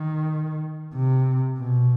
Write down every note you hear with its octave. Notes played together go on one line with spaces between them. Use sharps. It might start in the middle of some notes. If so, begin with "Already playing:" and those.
Already playing: D#3
C3
B2